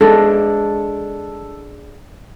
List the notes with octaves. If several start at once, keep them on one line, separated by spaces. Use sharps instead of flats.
G#3 D4 A4